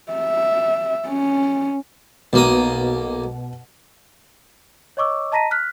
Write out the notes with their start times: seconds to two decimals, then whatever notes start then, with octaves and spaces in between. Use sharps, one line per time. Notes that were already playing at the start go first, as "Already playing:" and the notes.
0.12 E5
1.07 C#4
2.33 B1 B2 A#3 D#6
4.97 C#5 D#5 C#6 D6 E6
5.32 D#5 A5 A#5 A#6 B6 D#7
5.51 F6 F#6 B6